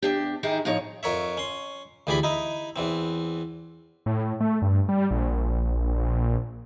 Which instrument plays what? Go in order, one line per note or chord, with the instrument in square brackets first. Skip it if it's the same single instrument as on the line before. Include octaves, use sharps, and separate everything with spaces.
[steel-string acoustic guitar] E2 D4 G4
D#3 D#4 E4 G4 G#4
A2 F3 D#4 C#5
[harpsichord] F2 A#4 C#5 E5
C#4 C6
D2 E3 G4 G#4 D5 B5
D#4 E4 D#5
E2 E3 C4
[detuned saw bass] A2
A3
G2
G3
A#1
A#1